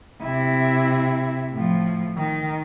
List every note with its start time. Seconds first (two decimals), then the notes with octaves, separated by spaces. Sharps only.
0.22 C3 E4
1.53 A2 F3
2.17 D#3